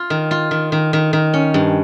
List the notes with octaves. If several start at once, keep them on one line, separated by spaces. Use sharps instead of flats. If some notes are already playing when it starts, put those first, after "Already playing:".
Already playing: F4
D#3
F4
D#3
D#3
D#3
D#3
C#4
G2